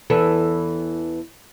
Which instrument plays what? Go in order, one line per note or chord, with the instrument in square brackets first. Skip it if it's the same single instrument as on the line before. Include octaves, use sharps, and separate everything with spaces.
[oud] E2 E3 A4